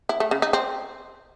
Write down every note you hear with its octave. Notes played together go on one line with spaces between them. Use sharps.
E4
A3
C#3
D#4
C4